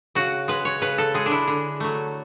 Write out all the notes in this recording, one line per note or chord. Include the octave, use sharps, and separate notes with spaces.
C#3 F#4
G#3 B4
C#5
C#3 B4
A4
G#3 G#4
D4
E4
D3
F#3 A3